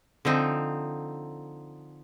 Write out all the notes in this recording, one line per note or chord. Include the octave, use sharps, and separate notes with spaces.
D3 F3 C4 D#4